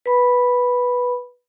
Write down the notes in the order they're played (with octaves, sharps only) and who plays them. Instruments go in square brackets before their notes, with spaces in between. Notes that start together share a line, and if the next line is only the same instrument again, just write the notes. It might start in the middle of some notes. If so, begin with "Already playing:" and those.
[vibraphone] B4 B5